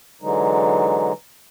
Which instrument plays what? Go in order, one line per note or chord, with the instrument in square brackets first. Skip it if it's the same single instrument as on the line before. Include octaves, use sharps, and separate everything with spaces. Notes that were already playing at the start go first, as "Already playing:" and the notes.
[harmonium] D3 E3 F#3 G#3 D#4